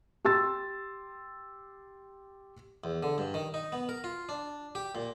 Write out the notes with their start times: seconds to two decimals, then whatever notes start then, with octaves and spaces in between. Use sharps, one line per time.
0.25 G4 C6 E6 A6
2.84 E2
3.03 D3
3.18 G2
3.34 D#3
3.54 D#4
3.72 B3
3.89 A#4
4.04 F4
4.29 D4
4.75 G4
4.95 A#2